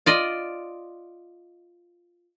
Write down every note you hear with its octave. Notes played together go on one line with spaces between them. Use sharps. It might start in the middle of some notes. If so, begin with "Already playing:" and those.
F4 D5 D#5